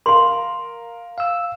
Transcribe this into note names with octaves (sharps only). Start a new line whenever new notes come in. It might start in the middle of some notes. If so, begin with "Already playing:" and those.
A#4 F5 C6
F5 E6